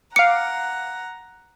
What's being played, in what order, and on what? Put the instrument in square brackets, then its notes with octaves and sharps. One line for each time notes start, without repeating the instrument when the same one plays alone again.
[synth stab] F5 D6 [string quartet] F#5 A#5 [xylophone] C#7